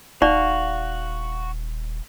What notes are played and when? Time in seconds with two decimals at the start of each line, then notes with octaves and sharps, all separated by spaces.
0.22 D#1 D#4 F#4 D5 F5